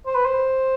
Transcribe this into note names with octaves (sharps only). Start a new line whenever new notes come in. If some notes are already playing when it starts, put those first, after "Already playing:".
C5
B4
C5